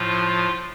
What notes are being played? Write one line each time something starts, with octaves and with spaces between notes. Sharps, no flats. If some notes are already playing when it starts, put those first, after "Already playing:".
Already playing: A2 F3 F4